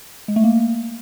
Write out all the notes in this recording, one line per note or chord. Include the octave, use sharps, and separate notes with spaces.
G#3
A3
A#3